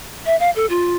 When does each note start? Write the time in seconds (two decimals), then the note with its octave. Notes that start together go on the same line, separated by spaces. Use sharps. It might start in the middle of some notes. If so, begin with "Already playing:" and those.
0.26 E5
0.40 F5
0.56 A4
0.70 F4